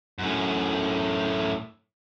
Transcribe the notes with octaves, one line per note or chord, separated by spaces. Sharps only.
F#2 A2